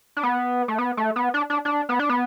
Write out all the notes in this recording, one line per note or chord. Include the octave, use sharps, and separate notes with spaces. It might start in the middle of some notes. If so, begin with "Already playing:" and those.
D4
B3
A3
B3
A3
B3
D4
D4
D4
B3
D4
B3